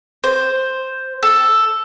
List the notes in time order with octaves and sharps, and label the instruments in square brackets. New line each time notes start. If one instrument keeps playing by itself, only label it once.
[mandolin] C5
A4